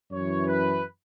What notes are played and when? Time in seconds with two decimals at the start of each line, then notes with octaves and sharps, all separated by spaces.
0.12 F#2 E3 C#5
0.46 B4